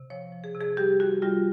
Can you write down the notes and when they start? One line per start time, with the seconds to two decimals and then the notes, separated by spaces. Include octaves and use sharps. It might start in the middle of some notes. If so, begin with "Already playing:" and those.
Already playing: C3
0.10 F3 C#5
0.32 F3
0.44 G#4
0.55 C3
0.61 G#4
0.77 G3 G4
1.00 G3 F#4
1.22 G3 F4